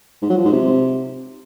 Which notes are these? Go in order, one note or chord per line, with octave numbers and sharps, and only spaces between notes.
G#2
F#3
F3
G#2
C3